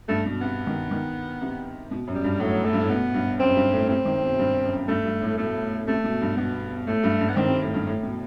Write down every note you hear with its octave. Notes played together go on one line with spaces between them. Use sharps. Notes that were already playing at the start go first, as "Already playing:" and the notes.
G2 A3
B2
C3 B3
D#3
D#3
C3
B2
F#2
G3
G2
A2 F#3
A3
G2
A2
B2 B3
G2
F#2 C4
G2
A2
C3 C4
D#3
B2
G2
F#2
G2 A3
G2
A2
B2 A3
C3 A3
B2
G2
B2 B3
A2 A3
G2
G2
B3
D#3 C4
C3
A2
G2
A2
B2